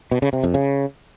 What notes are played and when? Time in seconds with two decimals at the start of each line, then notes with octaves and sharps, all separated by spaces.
0.11 B2
0.22 C#3
0.33 C3
0.44 F2
0.54 C#3